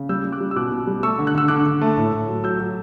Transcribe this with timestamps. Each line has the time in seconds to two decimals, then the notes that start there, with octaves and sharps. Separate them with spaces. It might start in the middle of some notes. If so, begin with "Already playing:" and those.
Already playing: C#3
0.09 G3 E6 G6
0.25 G3
0.32 D6 F#6
0.41 G3
0.51 E6
0.56 B2 D6 F#6
0.72 B2
0.87 G3
1.03 A3 C#6 E6
1.19 D3
1.27 F#6
1.35 D3 E6
1.48 D3 D6 F#6
1.66 D3
1.81 A3
1.97 A2
2.13 A2
2.29 F#3
2.44 F#3 E6 G6
2.60 F#3